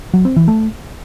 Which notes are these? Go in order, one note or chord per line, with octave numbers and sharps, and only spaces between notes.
F#3
C4
E3
A3